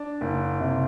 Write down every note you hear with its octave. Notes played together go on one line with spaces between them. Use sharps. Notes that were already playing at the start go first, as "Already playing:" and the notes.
Already playing: D4
F#1
C3